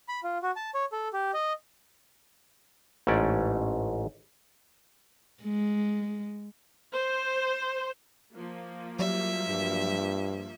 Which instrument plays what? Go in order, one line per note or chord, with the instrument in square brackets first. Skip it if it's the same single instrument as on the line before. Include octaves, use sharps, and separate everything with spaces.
[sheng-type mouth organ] B5
F4
F#4
A5
C#5
A4
G4
D#5
[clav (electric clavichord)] A1 G#2 A3 C#4 D5
[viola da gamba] G#3
[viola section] C5
F3 A#3
[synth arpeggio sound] F#3 G3 [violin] E5
[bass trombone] G2